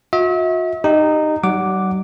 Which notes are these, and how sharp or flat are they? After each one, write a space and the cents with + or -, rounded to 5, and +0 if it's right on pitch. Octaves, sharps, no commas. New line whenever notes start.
F#4 -45 E5 -40
D#4 -15 G4 +0
G3 -45 F#5 +0 D6 +0